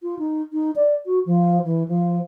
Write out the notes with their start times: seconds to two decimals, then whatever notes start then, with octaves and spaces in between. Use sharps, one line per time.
0.03 F4
0.19 D#4
0.53 D#4
0.76 D5
1.06 F#4
1.26 F3
1.64 E3
1.88 F3